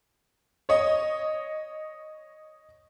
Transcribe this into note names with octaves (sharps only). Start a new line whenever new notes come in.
C#5 D#5